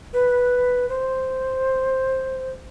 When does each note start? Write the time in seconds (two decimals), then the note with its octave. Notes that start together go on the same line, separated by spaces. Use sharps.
0.13 B4
0.89 C5